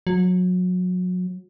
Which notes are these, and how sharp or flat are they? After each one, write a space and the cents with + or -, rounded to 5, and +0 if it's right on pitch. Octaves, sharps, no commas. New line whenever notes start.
F#3 -30